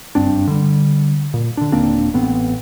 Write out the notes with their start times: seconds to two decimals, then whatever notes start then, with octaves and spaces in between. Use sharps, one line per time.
0.15 F#1 G2 C4 D4
0.48 D3 G3
1.34 A#2
1.57 D3 D4
1.72 D#1 A#3 C4 D4
2.14 A1 B3 C4